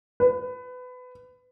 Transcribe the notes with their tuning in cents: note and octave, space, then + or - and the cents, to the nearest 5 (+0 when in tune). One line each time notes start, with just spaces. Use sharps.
B4 +25